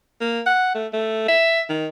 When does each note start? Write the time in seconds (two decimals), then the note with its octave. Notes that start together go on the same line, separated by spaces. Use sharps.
0.21 A#3
0.46 F#5
0.75 A3
0.93 A3
1.28 E5
1.70 D#3